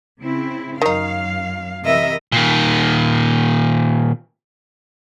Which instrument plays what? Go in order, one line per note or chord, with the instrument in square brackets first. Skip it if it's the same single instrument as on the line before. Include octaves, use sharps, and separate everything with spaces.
[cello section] C#3 C4 E4
[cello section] F#2 F#3 F5 [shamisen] D#3 D#4
[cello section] C3 E3 A#4 [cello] D#5 [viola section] E5
[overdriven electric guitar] A#2 D#3